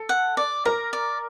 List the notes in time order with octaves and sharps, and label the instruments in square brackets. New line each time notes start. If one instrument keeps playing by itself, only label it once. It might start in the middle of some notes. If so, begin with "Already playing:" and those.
Already playing: [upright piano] A4
[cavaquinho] F#5
D5
[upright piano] A#4 [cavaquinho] A#5
[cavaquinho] D5